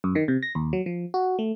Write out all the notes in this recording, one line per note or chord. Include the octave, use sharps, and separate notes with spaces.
F#2
D#3
C3
A#6
D#2
F#3
F3
F#4
A3